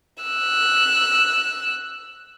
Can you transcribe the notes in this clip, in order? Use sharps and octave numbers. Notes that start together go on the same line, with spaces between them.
E6 F#6